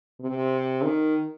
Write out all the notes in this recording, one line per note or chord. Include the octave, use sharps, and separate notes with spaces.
C3
D#3